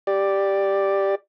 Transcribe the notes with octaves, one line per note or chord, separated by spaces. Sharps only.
G4 D5